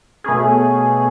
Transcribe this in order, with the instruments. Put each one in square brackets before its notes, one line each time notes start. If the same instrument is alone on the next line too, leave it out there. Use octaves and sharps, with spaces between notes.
[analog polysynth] B2 A3 C#4 G#4